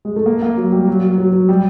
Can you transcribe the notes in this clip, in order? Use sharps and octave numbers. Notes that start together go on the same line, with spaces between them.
G#3
A3
A#3
A#3
F#3
G3
F#3
F#3
F#3
G3